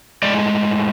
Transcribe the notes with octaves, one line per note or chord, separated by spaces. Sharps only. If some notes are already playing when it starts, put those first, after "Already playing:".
A2 G#3 D5